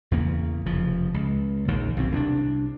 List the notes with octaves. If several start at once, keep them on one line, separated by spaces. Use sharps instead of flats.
E2 C#3 A#3
F1 C#3 F3
C#2
A#1 D#2 D#3
B1 G#2 C4
C2 C#4 D4